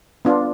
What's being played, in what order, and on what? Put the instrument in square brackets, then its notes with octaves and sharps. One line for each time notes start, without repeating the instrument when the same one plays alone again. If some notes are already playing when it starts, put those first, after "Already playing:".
[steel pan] B3 D4 F4